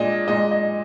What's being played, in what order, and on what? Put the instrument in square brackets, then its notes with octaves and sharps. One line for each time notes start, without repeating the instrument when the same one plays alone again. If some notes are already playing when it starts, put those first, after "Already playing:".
Already playing: [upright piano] A#2 G#3 D4 D#5
A#2 G#3 D4 D#5
D#5